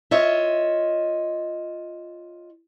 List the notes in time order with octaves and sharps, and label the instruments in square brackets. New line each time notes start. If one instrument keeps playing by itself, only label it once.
[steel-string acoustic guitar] F4 C#5 D#5 E5